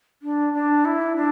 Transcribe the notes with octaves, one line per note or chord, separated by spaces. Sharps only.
D4
D4
E4
D4